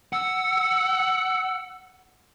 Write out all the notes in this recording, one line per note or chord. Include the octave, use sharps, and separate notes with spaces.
F#5 E6